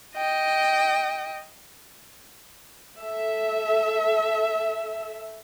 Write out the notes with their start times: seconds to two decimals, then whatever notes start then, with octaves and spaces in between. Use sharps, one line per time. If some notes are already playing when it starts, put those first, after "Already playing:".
0.16 D#5 G5
2.99 A4 E5